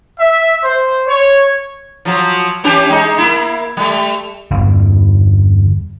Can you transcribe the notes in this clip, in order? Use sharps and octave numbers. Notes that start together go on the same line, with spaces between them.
E5
C5
C#5
F3 F#3
E3 C#4 G4
G#3 D#4
A#3 E4
G3 A3
G1 E2